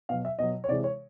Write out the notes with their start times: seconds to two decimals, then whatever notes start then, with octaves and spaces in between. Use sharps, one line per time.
0.09 B2 F#3 F5
0.25 E5
0.39 B2 F#3 D#5
0.64 C#5
0.68 C3 E3 G#3 D5
0.84 C#5